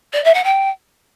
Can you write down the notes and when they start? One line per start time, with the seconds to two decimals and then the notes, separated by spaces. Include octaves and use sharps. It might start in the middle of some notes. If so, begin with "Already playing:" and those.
0.13 D5
0.24 E5
0.34 F#5
0.44 G5